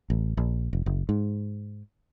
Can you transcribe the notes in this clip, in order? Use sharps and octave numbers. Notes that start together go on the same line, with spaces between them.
A1
A#1
F1
F#1
G#2